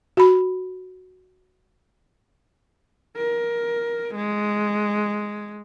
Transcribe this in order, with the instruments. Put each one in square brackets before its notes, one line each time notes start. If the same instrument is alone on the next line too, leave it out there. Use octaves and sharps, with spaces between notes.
[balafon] F#4 B5
[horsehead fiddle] A#4
G#3